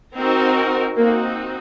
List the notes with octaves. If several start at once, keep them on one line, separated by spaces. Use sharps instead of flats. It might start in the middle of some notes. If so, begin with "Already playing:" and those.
C4 D#4 F#4 A#4
A#3 C4 D#4 F#4